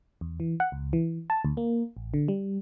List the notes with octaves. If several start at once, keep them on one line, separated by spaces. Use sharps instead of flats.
E2
E3
F#5
C#2
E3
A5
D2
A#3
A1
D3
G3